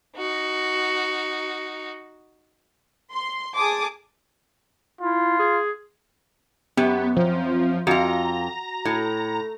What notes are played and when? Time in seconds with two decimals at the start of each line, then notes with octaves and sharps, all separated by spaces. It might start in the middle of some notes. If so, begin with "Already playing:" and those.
0.17 D#4 F#4
3.13 C6
3.57 G#4 G#5 A5 D6 D#6
5.01 E4 F4
5.39 G#4
6.77 F#2 B3 G4
7.16 F3 C4
7.87 F2 F4 F#4 A#5
8.85 A2